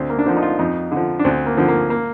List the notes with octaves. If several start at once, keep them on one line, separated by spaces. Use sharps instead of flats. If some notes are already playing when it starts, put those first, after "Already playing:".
Already playing: D2 C4
A#3
D4
D3 F3 C4
D#4
F4
F2 D#4
D3 F3
D4
D2 C4
A#3
D3 F3 C4
A#3
A#3